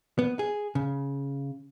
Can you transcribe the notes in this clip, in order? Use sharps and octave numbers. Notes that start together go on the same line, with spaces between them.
B3
G#4
C#3